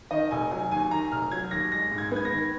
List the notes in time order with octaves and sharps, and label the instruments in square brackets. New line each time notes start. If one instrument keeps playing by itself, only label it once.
[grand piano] D#3 D#5
F1 G#5
F#3 G#5
D#2 G#5
D#3 A#5
F1 F6
F#3 G#6
D#2 A#6
G#3 A#6
G#2
G#6
B3 G#6
A#6
D#3